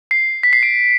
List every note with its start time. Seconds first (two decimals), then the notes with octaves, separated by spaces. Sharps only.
0.11 C7
0.43 B6
0.53 C7
0.63 D7